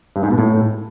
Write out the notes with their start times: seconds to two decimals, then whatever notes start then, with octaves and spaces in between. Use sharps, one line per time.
0.16 G2
0.23 G#2
0.31 B2
0.38 A2